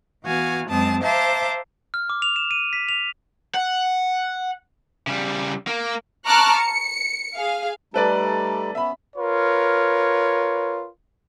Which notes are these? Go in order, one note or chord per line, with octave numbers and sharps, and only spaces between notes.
E3 B3 F#4 F5 G#5
F#2 G#3 C4 A5 D#6
C5 E5 F5 A5 A#5 D6
F6
D6
F7
E7
D#7
B6
F7
F#5
C#3 G3
A#3
A5 A#5 C#6 D6 F6 F#6
C#7
G#4 F5
G3 A3 D#4 A4 B4 D5
B3 C#4 E5 B5
F4 A#4 B4 C#5